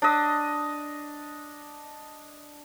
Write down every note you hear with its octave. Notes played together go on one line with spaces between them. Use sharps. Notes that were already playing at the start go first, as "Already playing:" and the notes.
D4 D#5